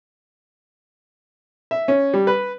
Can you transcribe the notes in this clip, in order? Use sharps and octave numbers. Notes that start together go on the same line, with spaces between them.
E5
C#4
G3
B4